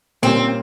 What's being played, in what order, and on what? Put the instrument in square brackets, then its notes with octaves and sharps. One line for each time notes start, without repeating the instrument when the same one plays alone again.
[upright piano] A#2 G3 A#3 C#4 [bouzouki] C4